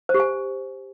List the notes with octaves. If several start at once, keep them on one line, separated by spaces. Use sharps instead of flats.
C5
G4
G#5